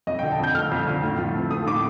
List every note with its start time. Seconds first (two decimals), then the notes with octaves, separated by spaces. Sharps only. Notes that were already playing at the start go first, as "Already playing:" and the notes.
0.07 F2 D#5
0.19 G5
0.23 D3
0.32 A5
0.40 F2 G6
0.55 A3 F6
0.72 F2
0.87 D3
1.03 A2
1.18 F3
1.36 C4
1.50 A3 D#6
1.66 A2 D6